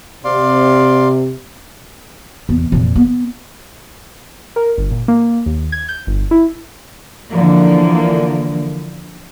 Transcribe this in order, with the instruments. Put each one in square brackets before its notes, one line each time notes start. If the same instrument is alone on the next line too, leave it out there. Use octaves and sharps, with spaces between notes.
[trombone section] C3 [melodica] D5 F5 C6
[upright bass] E2
F2 A#2
B3
[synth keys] A#4
G1
A#2
A#3
D#2
G#6
G6
G1
E4
[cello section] D3 E3 F3 A#3